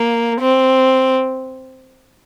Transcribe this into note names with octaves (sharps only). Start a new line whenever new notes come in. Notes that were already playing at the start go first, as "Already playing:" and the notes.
Already playing: A#3
C4